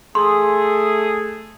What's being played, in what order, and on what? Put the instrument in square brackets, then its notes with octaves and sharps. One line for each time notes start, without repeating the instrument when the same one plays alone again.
[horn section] A3 G#4 [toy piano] C6